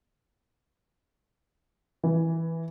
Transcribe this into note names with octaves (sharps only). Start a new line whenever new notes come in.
E3